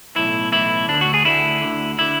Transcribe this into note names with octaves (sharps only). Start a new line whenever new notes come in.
B1 A2 E3 E4
B1 A2 E3 E4
D2 D3 D4
F#4
G#4
D2 D3 E4
D2 D3
D3 E4